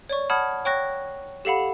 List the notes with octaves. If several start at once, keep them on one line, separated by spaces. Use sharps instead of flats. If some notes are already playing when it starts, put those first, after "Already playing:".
C#5 D5 C#6
F#5 A5 B5 D#6 F6 G#6
C#5 G5 C#6 F#6 A#6
G4 A4 F5 F#5 B5